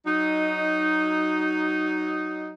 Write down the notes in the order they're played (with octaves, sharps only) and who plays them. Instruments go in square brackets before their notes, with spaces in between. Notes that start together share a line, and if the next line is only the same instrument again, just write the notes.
[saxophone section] F#3 D#4